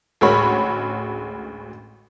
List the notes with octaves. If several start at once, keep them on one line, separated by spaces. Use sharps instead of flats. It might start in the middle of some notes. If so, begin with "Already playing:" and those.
A1 D2 G#3 F#4 C#5 B5